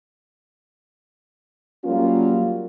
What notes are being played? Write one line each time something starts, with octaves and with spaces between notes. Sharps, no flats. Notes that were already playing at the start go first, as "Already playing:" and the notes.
F#3 G3 A#3 C#4 F4